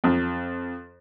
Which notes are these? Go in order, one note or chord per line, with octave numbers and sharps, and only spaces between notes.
F2